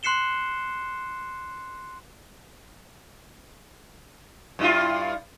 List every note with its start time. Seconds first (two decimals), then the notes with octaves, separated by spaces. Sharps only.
0.03 C6 F#6 C7 C#7 E7 G7
4.59 G2 E4 F4